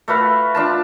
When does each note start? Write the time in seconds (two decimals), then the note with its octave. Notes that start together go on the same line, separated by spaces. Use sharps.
0.08 A3 F#4 B4 F5
0.55 D4 F4 A5